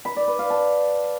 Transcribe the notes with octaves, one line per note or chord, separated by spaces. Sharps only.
B5
D5
B4
F5
A5